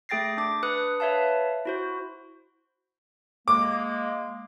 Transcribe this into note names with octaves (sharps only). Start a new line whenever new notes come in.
A3 G#4 G5 A6 A#6 C7
D4 D6
D4 B4 D#6 F#6 C#7
B4 C#5 E5 F5 A5
E4 F#4 C5
G#3 A#3 D6